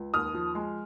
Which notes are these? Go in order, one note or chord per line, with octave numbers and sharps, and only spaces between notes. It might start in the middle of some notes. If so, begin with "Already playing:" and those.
Already playing: C#2
D#2 D#6 F6
F3
G#3